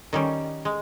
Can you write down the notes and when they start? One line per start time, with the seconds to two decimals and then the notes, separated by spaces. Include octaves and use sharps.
0.13 D#3 G3 C#4
0.65 G#3